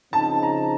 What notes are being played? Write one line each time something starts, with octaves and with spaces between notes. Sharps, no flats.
C#3 F3 C4 D#4 A5
A#5